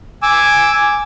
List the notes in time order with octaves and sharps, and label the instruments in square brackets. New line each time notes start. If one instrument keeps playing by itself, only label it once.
[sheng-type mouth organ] G#5 D6 E6